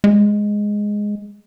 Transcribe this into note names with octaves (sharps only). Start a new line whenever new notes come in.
G#3